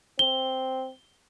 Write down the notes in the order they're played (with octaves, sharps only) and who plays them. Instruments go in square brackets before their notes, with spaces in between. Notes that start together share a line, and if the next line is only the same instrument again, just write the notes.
[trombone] C4 [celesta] G7